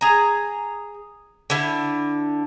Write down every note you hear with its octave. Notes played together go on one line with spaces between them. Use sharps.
G#4 A#5
D3 E4